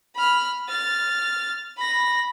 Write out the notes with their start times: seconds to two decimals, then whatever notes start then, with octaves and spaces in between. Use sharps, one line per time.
0.15 B5 F6
0.68 F6 A6
1.77 B5 A#6